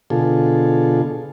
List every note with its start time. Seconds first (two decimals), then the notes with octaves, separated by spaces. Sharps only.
0.10 B2 D3 F4 G#4 A4